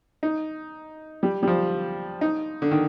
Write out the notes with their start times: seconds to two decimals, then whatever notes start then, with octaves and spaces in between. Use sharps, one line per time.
0.23 D#4
1.23 G3
1.43 G3
1.47 F3
2.21 D#4
2.62 D3
2.71 D#3